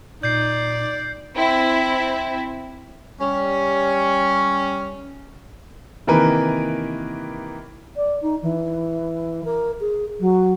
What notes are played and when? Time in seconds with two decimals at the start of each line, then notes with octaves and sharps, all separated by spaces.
0.23 A#2 D#4 D5 G6 C7
1.34 C4 E4
3.20 G3 C#4
6.07 C3 D#3 E3 A#3 A#4 B4
7.96 D5
8.22 D#4
8.42 E3
9.44 A#4
9.80 G#4
10.19 F#3